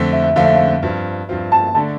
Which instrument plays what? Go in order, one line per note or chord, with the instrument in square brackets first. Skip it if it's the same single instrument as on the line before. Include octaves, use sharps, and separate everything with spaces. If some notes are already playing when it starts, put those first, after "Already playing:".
Already playing: [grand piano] F2 D3 A3 C4
[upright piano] E5
E5
[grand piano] F2 D3 A3 C4 [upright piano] F5
[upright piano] E5
F5
[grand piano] G2 F3 C4 F4
G2 F3 C4 F4
[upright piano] A5
[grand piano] D3 A3 D4 [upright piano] A5